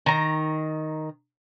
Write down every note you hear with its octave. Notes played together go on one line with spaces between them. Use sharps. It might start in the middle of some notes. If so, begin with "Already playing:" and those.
D#3 A#5